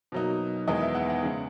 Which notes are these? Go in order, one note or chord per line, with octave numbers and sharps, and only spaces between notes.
B2 F#3 A#3 D#4
E2 D#3 G#3 B3 D#5
E5
F#5
F#5
C#3 G#3